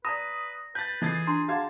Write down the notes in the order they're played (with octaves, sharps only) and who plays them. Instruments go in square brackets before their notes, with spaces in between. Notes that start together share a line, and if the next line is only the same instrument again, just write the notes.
[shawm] B4 [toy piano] D5 A#5 B5 [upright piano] D#6 [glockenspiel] A#6
[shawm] B4 [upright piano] G6 A6
[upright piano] E3 A6 C7 [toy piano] F4 A4 D#5 [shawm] G#4
[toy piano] D4 A#5 C6
[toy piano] F#4 G#4 F#5 [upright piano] F5 G#6 [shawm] A5